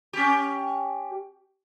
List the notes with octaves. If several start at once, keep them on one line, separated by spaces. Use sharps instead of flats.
C#4 G4